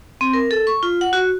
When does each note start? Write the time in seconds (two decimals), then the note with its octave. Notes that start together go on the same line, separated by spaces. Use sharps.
0.21 C4
0.33 A#4
0.51 A4
0.67 C#6
0.83 F4
1.01 F#5
1.13 F#4